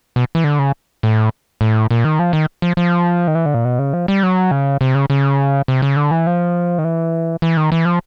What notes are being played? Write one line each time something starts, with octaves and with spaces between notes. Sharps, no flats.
B2
E3
D3
C#3
A2
A2
A#2
D#3
F3
D#3
F3
F3
D#3
E3
D3
A#2
B2
C#3
F3
G3
F#3
C#3
C3
C#3
C#3
C3
C#3
D3
E3
F3
D#3
E3
E3
D#3
E3
F3